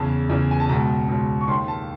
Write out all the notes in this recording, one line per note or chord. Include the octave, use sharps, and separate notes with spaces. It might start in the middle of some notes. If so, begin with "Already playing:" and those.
Already playing: E2 C#3 E3 A5
E2 C#3 E3
G#5
A5
C#2 B2 A#5
C#2 B2
C#6
D#2 D#3 C6
A5